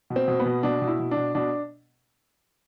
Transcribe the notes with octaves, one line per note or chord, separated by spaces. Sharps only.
B2
C4
B2
B3
B2
B2 D4
B2
E4
B2
D4
B2
B2 D4